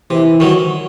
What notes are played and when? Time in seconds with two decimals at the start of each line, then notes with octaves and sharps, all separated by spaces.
0.10 C3 E3
0.40 D#3 F#3